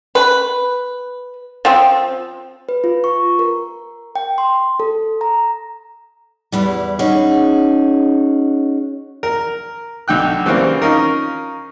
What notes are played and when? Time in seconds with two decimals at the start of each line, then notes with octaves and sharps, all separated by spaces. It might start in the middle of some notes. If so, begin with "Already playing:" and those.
0.15 B4
1.65 F3 C4
2.69 B4
2.84 F4
3.04 C#6
3.39 A#4
4.16 G5
4.38 C6
4.80 A4
5.21 A#5
6.52 E2 E3 G3
6.99 C#4 D#4 F#4 G#4
9.23 A#4
10.08 B1 D3 G5 F#6
10.45 C#3 E3 G3 A#3 C4
10.82 C#4 D#4 F4 A#4